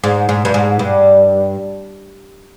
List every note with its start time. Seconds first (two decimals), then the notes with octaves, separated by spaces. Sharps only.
0.04 G#2
0.29 G#2
0.45 G2
0.54 G#2
0.79 G2